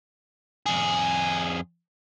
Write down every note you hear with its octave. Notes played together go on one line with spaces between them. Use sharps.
F2 G#4